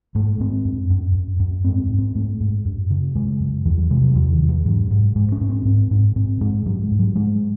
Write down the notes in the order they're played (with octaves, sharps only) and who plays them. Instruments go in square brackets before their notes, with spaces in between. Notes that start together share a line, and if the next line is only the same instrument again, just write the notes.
[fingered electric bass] G#2 A3
G#2 C4
F#2
F#2
F#2
F#2
G#2 C4
G#2
C4
G#2 A3
G#2
F#2
C#3
C#3 G#3
F#2
E2 E3
F#3
C3 G#3
F#3
E2 E3
D#3
E2
E3
G#2 F#3
G#2
G#2 G#3
C#4
G#2
C4
G#2 C4
G#2
G#2 C4
G#2 G#3
G#2 F#3
G#3
G#2
F#3
G#2 G#3